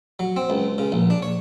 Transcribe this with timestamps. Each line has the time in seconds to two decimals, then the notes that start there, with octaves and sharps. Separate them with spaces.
0.19 F#3
0.36 C4
0.50 C#2
0.78 C#3
0.92 A#1
1.10 D4
1.22 C#5